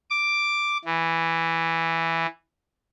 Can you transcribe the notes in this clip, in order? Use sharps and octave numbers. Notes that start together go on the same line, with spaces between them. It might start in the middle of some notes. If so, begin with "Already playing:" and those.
D6
E3